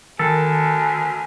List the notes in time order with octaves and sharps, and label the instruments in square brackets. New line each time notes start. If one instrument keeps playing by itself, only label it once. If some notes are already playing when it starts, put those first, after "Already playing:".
[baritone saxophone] D2 [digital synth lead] D#3 [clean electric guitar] A4 [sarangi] G#5